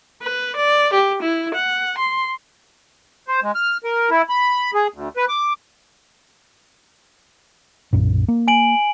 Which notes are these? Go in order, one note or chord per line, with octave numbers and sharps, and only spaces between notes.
B4
D5
G4
E4
F#5
C6
C5
G#3
F6
A#4
E4
B5
G#4
D2
B4
D6
B1 F#2 A#2
A#3
G#5 D7 F#7